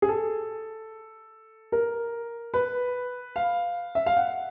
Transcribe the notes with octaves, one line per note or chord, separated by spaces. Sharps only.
G#4
A4
A#4
B4
F5
E5
F5
F#5